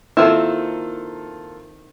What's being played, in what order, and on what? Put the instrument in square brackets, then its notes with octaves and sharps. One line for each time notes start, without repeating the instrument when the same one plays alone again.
[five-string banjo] D#3 C4 E4 [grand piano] A#3 F4 A4